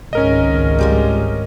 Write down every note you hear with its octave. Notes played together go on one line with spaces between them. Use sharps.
G#1 C#2 G#2 C#4 A#4 D#5
G3 G#3 F4